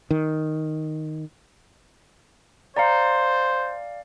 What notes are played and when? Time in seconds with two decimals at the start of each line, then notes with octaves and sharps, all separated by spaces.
0.11 D#3
2.77 C5 D5 F5 G#5 A#5 C#7